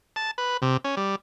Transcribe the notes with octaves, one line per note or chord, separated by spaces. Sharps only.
A5
B4
C3
C#4
G3